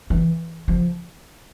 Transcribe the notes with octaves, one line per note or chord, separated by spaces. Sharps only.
E3
F3